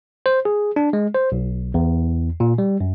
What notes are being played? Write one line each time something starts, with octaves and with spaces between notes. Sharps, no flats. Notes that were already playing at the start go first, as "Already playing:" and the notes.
C5
G#4
D4
G#3
C5
B1
E2
A#2
G3
F#2